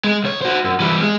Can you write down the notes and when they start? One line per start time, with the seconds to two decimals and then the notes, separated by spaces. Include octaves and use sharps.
0.04 G#3
0.24 C#2 C#5
0.42 F#4 C5
0.64 F#2
0.80 E3 G3
1.01 G#3